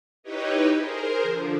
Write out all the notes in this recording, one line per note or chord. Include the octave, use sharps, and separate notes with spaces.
D#4 E4 G4 B4 C#5 D#5
G#4 A#4 C5
D3 F3